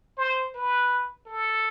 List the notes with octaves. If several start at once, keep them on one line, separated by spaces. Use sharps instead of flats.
C5
B4
A4